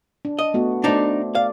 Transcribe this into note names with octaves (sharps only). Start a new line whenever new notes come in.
D4
D#5
A3 B3 F#4
A3 D4 D#4 C5 D5
D5 F5